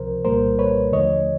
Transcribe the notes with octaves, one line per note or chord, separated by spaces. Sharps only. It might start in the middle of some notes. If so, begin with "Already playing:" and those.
Already playing: C#2 C3 F3 A#4 C5
C2 A#2 G3 A#3 A#4 C5
B4 C#5
D#2 D3 F3 A3 C#5 D#5